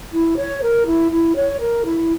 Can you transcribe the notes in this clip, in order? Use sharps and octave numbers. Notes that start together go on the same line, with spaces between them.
E4
C#5
A#4
E4
E4
C#5
A#4
E4